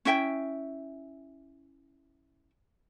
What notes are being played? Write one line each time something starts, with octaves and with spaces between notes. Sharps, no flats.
C#4 E4 E5 G5